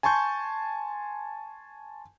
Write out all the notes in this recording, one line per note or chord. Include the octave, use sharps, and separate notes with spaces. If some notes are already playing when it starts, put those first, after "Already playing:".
G#5 A5 C6 C#6 G6